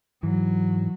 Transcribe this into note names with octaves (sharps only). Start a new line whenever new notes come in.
G#2 E3 F#3